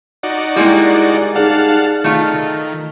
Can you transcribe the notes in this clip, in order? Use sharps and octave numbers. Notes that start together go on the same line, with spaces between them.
D#4 F#4 D5
G3 G#3 A#3 E4
D#4 G#4 D5 F5 F#5 A5
D#3 A3 F4